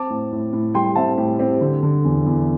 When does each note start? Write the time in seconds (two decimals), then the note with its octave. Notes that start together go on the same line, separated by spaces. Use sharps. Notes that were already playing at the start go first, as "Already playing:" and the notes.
Already playing: C4 A5 D6
0.10 A2
0.32 A2
0.53 A2
0.74 G3 G5 C6
0.96 C4 E5 A5
1.17 A2 G4
1.39 C4 G4
1.61 D3
1.83 D3
2.05 E2
2.26 E2